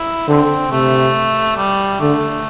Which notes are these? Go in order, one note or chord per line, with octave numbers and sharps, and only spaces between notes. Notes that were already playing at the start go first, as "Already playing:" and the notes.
Already playing: E4
D3 C4
C3 A3
G3
D3 A3